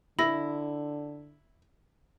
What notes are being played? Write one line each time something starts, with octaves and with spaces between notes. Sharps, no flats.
D3 E4 B5 E6 A#6